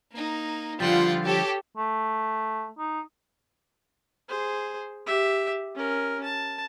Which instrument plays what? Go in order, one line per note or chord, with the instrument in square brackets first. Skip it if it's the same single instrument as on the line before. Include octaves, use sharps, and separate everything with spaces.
[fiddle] A#3 D#4
[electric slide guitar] D3 F3 G3 [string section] F4 [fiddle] F#5 G5
[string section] G4 [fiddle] A4 C#5
[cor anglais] A3
D#4
[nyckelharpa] G#4 C5
G4 E5
C#4 A#4
A5